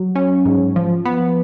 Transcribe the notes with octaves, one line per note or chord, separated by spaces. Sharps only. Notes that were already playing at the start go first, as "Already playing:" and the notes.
Already playing: F#3
C#4
G#2
F3
B3